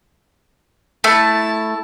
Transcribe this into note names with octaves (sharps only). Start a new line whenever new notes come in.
A3 E4 A5